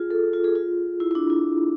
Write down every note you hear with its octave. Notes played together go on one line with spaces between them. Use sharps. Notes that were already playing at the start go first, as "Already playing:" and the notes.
Already playing: F4 G#4
A4
F4
G#4
F4
E4
E4
D4
E4